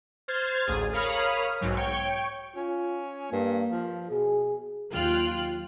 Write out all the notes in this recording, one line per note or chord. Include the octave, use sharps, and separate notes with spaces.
C5 F6 G#6 A6
A1 D2 G#4
A#4 C#5 F5 B5 D#6 F6
B1 G#2 F#3
C#5 G5 C#6
C#4 F4
G2 A#3
F3
B2 G#4
D#2 F#3 F4 G5 F6 F#6